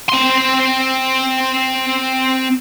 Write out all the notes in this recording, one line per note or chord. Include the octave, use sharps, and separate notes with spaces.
C4 C6